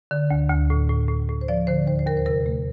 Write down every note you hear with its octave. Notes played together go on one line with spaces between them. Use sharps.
D3
D2
D2
A2
A2
A2
A2
C5
F3 D5
D3 C5
D#2 C5
C5
D#2 A#4
C5
C3 A#4
A3